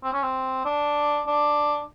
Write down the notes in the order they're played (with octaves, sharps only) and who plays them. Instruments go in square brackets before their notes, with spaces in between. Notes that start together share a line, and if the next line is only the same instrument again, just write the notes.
[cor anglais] C4
C#4
C4
D4
D4